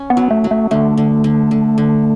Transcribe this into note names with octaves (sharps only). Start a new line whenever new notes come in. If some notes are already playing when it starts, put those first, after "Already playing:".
Already playing: C#4
B3
F#3
A3
F#3
A3
D3 A3
D3
D3
D3
D3